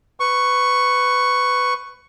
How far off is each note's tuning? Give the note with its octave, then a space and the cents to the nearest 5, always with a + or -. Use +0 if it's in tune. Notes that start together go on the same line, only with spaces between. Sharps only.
B4 +15 C#6 +0